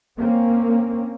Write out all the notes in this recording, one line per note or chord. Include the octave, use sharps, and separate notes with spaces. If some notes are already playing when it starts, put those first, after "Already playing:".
A#3 C4 C#4